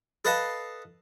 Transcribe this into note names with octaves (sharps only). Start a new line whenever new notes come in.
A4 B4 D#5 F5 A5